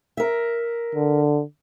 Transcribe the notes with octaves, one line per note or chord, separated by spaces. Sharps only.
A#4 E5
D3